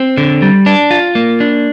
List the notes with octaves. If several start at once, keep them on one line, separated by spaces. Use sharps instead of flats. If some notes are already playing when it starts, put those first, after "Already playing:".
Already playing: C4
D3
G3
D4
F4
A#3
D4